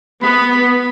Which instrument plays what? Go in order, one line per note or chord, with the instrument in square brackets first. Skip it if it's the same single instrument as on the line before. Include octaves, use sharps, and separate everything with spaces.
[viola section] B3 [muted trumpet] B5